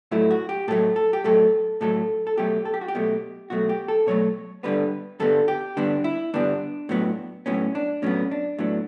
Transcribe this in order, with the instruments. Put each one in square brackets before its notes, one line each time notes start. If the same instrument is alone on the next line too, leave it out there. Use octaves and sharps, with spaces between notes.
[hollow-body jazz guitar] A2 F#3 A3 E4
F#4
G4
A2 F#3 A3 A4
A4
G4
A2 F#3 A3 A4
A2 F#3 A3 A4
A4
B2 F#3 A3 G4
A4
G4
F#4
G4
B2 F#3 A3
B2 F#3 A3 F#4
G4
A4
B2 F#3 A3 C#5
G2 D3 G3 B3 B4
G2 D3 G3 B3 A4
G4
G2 D3 G3 B3 D4
E4
G2 D3 G3 B3 D4
A2 F#3 B3
A2 F#3 B3 C#4
D4
A2 F#3 B3 C#4
D4
A2 F#3 B3 D4